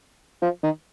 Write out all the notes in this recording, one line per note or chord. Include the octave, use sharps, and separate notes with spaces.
F3
D#3